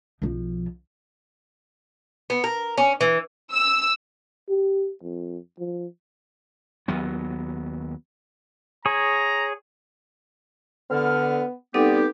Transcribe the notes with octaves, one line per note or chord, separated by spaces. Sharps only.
B1 F3
B3
A#4
C#4
E3
E6
G4
F2
F3
D#2 F#3 B3
G#4 C#5 A#5
D3 B3 F6
G3 B3 C4 D#4 G4 A4